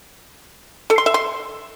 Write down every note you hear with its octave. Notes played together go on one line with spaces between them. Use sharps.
A4
C6
E5
C6